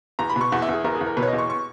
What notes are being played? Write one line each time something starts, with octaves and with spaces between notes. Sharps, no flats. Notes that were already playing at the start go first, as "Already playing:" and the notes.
E2 A#5
B5
B2 C#6
E2 F#5
E5
E2 G#4
E2 A#4
G#4
E2
A#4
B2 B4
C#5
D#5
E2
C#6
C#6